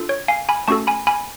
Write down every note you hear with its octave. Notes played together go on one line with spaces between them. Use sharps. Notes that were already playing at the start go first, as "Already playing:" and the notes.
Already playing: D4 F4 A4
C#5
F5 G#5
G#5 B5
A3 C#4 F#4 A4 A5 C#6
G#5 B5
G#5 B5